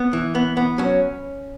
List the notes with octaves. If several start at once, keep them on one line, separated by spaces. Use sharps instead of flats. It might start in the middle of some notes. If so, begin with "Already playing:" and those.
Already playing: B3
E3
B3
B3
F#3 C#4